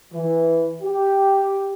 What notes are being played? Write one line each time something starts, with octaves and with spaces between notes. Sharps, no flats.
E3
G4